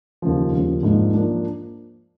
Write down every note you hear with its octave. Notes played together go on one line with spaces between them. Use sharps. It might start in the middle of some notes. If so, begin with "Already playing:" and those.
D#2 C#3 F3
D#2 C#3 F3
G#2 F3 A#3 D4
F3 A#3 D4